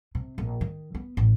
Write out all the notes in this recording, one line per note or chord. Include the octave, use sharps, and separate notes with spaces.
C3
A#1
D#3
B3
A1